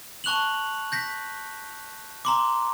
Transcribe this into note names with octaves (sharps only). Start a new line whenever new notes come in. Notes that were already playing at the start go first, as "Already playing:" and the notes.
A5 C#6 F#6 F7 F#7
G6 A#6 B6
A#5 C6 D6